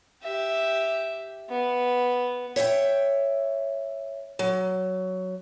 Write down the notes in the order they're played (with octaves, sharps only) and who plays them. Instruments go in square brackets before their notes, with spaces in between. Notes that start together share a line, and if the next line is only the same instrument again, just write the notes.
[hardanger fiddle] G4 E5
B3
[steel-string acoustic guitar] C#5 E5 F5 G5
F#3